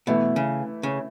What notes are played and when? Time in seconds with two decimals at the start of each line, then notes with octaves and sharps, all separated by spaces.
0.07 B2 E3 A3 E4
0.36 C#3
0.83 C#3